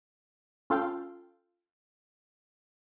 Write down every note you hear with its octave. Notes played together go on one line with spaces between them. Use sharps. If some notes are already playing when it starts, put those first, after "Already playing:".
C#4 F4 A4 F5 G5